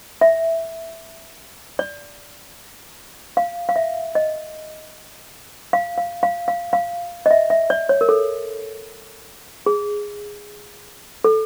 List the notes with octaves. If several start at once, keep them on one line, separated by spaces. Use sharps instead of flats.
E5
D5
F5
F5
E5
D#5
F5
F5
F5
F5
F5
D#5
E5
E5
D5
C#5
A#4
A4
G#4
A4